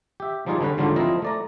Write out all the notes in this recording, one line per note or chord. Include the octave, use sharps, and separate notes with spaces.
G4 E5
F3 G3 D#4 F4 G#4 D5
D3 G3 C#4 B4
G#2 D3 F#3 G3 D4 F4
F3 C4 E4 F4 A#4 D#5
A3 D5 A#5